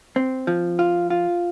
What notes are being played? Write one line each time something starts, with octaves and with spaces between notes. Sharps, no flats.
C4
F3
F4
F4